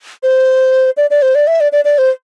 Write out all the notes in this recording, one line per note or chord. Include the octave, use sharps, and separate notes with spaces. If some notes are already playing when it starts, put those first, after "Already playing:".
C5
D5
D5
C5
D5
E5
D5
D5
D5
C5